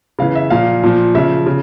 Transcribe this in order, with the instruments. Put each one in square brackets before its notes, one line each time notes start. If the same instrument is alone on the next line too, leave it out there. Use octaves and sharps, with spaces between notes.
[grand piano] C#3 E3 F5
E5
A#2 F3 F5
A#2 F3
C#3 F3 E5
C#3